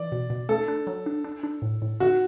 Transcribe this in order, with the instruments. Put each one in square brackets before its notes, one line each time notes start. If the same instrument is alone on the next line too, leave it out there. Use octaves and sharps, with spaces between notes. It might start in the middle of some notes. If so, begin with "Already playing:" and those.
Already playing: [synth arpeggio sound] E3 [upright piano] D5
[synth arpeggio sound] B2
B2
[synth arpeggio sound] A3 [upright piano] A4
[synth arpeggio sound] D4
F#3
D4
D4
D4
A2
A2
[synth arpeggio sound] D3 [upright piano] F#4